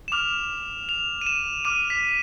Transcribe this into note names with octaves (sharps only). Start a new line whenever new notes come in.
E7
D6 F6 F7
F7
D#7
E7
D6 F6 D#7
B6